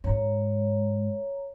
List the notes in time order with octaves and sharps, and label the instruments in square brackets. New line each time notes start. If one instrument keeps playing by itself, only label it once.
[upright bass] G#2 [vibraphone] C#5 A#5